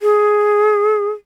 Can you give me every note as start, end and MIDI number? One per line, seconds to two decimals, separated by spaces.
0.01 1.10 68